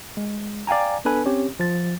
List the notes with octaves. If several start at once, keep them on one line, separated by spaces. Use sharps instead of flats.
G#3
D5 F5 G5 G#5 A#5
B3 D4 A4 B4 G#5
C4 C#4 G4 C#5
F3 A6